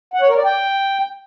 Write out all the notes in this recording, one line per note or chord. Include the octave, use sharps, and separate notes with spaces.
F#5
C#5
A#4
D5
G5